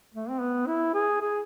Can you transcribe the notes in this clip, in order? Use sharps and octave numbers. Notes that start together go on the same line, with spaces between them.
A3
C4
B3
E4
G#4
G#4